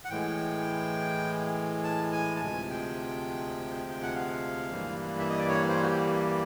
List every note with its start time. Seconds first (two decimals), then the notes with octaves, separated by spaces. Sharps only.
0.05 F#5
0.10 A2 E3 G#3 G5
1.84 A5
2.12 G#5
2.36 A5
2.41 D2 C3 F3 G#3 G#5
2.70 G5
3.90 G5
4.02 F#5
4.15 F5
4.72 G2 E3 G3 A#3
5.19 E5
5.30 D#5
5.38 D5
5.49 C#5
5.68 C5
5.83 F#4
5.88 G4